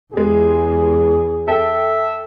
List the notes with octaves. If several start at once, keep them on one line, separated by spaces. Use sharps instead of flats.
E2 G#3 G4 G#4
A4 E5 G5